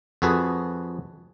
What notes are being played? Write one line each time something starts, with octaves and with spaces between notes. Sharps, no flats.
F2 F#4 G#4 A4 B4